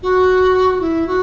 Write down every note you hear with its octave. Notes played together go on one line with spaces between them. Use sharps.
F#4
E4
F#4